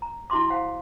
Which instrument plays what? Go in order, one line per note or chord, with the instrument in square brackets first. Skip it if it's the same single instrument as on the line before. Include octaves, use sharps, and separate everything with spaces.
[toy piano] A#5
E4 F#4 E5 C6 D6
C5 F5 F#5